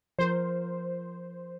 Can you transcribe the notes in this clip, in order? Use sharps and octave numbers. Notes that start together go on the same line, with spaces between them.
F3 A#4 C5